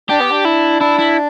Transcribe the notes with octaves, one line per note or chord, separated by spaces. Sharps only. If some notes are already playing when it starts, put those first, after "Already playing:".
D4 G4
B3
D4
E4
D4 E4
E4